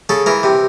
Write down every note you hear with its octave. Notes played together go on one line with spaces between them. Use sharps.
C#3 A4
E3 A#4
C3